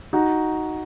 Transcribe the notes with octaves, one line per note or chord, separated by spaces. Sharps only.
D#4 F#4